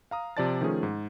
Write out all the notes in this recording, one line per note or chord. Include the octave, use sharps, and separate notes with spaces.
F5 A#5 D#6
C3 F3 F4 D5 A5 A6
D#3 F3 A3 C#4 G#4
G#2